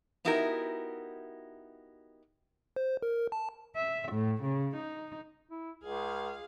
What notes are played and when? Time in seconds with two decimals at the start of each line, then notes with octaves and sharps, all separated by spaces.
0.25 B3 D#4 E4 F#4 G4 A#4
2.76 C5
3.02 A#4
3.32 A5
3.75 E5
4.12 A2
4.42 C#3
4.76 D#4
5.51 E4
5.84 C#2 G#4 F5